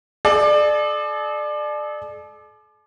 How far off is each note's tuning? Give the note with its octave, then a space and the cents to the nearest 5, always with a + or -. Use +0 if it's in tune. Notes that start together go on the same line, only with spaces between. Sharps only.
A4 -45 D5 +25